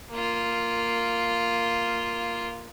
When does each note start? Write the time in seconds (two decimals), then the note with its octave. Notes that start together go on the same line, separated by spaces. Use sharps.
0.10 A#3 F4